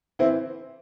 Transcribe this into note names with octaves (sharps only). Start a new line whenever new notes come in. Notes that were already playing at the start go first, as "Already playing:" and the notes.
E3 C4 E4